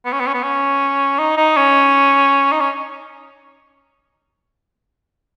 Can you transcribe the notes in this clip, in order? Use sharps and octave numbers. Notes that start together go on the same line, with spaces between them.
B3
C#4
B3
C#4
B3
C#4
D#4
D#4
C#4
D#4
C#4